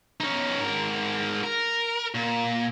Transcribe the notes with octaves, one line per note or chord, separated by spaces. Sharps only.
C#4 D#4
G#2 A#4
A#4
A#2